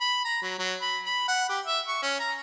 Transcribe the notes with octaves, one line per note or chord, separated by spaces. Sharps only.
B5
A#5
F#3
F#3
B5
B5
F#5
G4
E5
C#6
C#4
A#5